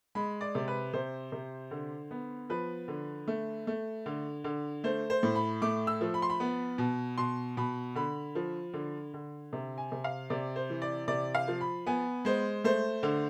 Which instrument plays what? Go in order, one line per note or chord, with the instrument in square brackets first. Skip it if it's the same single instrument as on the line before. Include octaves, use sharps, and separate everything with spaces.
[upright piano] G#3 B5
D5
C3
B4
C3 C5
C3
D3
B3
F3 B4
D3
A3
A3
D3
D3
A3 C5
C5
A2
B5
A3 D6
E6
F3
B5
C6
B5
B3
B2
B2 C6
B2 B5
D3 B5
F3
D3
D3
C3
G#5
C3
F5
C3 D5
C5
E3
D5
C3 D5
F5
F3
B5
B3 G#5
G#3 C5
A3 C5
D3